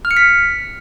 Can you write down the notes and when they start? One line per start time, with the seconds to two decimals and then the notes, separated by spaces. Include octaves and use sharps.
0.05 F6
0.11 C#7
0.17 B6